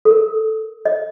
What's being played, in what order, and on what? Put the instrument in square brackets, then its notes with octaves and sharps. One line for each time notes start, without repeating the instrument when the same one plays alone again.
[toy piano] A4
A#4
D#5